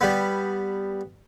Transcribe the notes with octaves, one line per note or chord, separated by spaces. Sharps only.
G3 B3